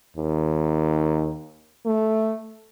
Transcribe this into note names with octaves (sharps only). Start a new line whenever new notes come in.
D#2
A3